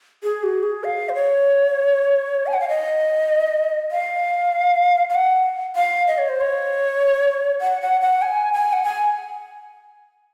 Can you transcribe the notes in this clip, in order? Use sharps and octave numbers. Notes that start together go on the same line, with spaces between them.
G#4
F#4
G#4
F5
C5
C#5
G#5
F#5
F5
D#5
F5
F5
F#5
F5
D#5
C#5
C5
C#5
F#5
F#5
F#5
G#5
G#5
F#5
G#5